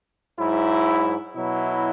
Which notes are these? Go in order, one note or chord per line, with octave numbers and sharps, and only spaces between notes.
G#2 F#3 E4
B2 F#3 E4